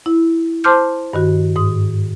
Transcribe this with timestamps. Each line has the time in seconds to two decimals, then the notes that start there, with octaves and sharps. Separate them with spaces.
0.06 E4
0.64 C5 A5 C6 D6 F6 G6
1.13 G2 D#3 F#4
1.56 G#2 D#6